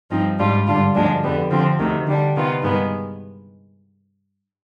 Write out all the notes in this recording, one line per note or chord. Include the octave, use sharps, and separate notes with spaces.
G2 F3 C4 D#4
G#2 G3 D4 F4
G2 D3 G3 D4 F4
D2 D3 F3 G#3 D4
F2 D3 G3 B3
D3 F3 C4
D2 C3 D#3
D3 G3 D4
C3 D#3 B3 F4
G2 D#3 G#3 B3